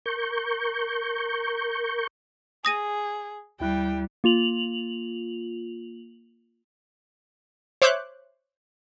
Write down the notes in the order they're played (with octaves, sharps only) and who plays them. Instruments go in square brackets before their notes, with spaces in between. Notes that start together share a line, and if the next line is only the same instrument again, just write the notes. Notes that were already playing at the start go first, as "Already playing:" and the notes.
[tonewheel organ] A#4 C#6 G6
[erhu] G#4 [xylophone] D#6 A#6 D#7
[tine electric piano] D2 E4 F#6 [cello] G3 [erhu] G5
[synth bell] A#3 F4 F7 F#7
[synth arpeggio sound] C5 C#5 E5 D6 F#6 G6